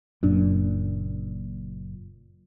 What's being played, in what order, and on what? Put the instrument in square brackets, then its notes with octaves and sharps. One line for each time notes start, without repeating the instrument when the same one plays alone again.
[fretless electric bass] F#1 A#2 D4 [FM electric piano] F#2